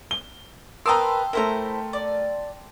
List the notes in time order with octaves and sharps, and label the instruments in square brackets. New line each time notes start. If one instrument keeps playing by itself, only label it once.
[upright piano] G7
[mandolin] A#4 B4 [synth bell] G5 A5 C6 [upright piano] A#5 D#6 E6
[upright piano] A3 A#4 [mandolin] E4 C5 A#5
[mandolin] D5